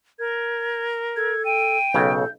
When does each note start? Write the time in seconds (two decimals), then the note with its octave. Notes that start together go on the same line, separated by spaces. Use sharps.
0.19 A#4 G#6
1.16 A4 G#6
1.45 G5 D#7
1.94 B1 C#3 A4 G6